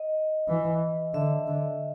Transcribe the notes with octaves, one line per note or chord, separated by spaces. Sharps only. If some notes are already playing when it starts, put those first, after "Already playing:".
Already playing: D#5
E3
D3 E5
D3